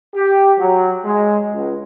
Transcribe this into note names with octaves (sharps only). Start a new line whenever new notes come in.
G4
F#3
G#3
C#2